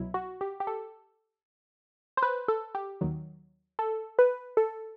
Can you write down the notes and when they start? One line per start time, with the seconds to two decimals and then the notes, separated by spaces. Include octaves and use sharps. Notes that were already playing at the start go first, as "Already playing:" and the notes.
Already playing: C2 B2 F#3 E4
0.14 F#4
0.41 G4
0.60 G4
0.67 A4
2.17 C5
2.23 B4
2.48 A4
2.75 G4
3.01 D#2 D#3 F#3
3.79 A4
4.19 B4
4.57 A4